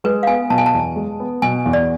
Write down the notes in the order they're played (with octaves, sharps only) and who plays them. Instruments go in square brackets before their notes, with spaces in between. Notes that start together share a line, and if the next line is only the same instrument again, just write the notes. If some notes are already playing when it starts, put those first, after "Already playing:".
[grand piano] G#3 [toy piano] B4
[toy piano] F5
[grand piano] B3 [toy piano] G#5
[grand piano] B2 [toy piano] A5
[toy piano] G#5
A5
[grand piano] E2
G#3
B3
[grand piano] B2 [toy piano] G#5
[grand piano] E2
[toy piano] D5